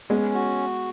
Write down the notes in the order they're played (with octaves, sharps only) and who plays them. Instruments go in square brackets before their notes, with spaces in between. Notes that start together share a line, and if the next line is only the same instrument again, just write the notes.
[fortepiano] G#3 B3 [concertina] C#4
[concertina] F#4